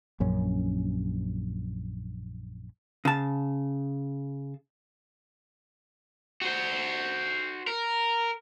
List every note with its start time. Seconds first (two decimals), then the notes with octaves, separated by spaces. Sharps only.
0.20 A#1 F#2 C#4
3.05 C#3 A5
6.42 F#4 C5
7.67 A#4